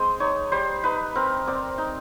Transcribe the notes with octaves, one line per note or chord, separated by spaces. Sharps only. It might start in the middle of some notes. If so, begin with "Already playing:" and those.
Already playing: G#3 C4 C5
D#4 C#5
G3 C5
D#4 B4
C4 A#4
C4 D5
D#4